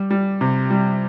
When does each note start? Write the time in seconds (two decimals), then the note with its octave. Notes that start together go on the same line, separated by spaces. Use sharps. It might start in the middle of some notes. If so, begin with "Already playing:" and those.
Already playing: G3
0.10 G3
0.41 C3
0.70 G3